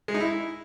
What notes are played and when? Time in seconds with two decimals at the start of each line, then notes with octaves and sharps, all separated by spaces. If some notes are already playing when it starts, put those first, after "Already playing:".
0.08 G#3
0.14 D#4
0.20 E4